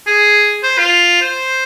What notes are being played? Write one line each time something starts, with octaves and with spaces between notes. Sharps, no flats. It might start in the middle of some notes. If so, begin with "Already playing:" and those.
G#4
C5
F4
C5